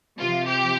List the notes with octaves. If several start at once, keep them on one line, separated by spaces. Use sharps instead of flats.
C3 F3 F4
G4